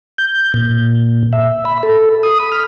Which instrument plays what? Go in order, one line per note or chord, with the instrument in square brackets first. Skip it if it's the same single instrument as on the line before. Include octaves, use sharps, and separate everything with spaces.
[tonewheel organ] G6
A#2
E5
B5
A4
D#6
B5
F6